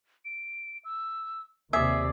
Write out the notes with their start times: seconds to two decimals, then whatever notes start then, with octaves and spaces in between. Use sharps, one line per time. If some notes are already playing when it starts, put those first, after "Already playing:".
0.25 D7
0.85 E6
1.73 D#2 C3 G#4 D5 E5 E6